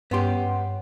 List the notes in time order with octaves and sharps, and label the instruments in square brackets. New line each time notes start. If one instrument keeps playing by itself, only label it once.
[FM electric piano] G2 [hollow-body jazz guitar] B3 C#4 G4 [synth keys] F#5 C6